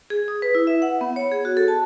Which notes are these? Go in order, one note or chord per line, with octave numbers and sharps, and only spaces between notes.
G#4
D#6
B4
E4
E5
F#5
B3
C#5
G#4
F#4
A4
A5